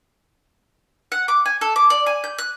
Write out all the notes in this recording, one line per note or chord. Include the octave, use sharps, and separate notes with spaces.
F#5
D6
G#5
A4
D6
D5
G#5
G6
F#6